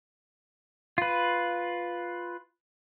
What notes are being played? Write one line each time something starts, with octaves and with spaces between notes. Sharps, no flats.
F4 B4